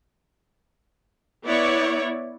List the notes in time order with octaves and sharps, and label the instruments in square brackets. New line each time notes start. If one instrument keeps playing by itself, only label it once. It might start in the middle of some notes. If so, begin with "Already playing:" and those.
[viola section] B3 E4 C#5 D5